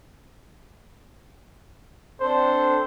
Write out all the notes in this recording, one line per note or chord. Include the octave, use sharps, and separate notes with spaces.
C4 D4 A4 C5